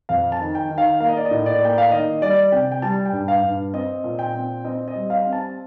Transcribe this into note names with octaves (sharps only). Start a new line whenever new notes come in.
F2 F5
A5
D#3
G5
D#3
F5
A#3 F5
D#5
D5
D#5
A2
D5
A#3 G5
F5
D#3 D#5
G3 D5
C3 G5
G5
G3 A5
G5
G2
F5
G2
C4 D#5
A#2
G5
C4
C4 D#5
D#5
G3
F5
C4
A5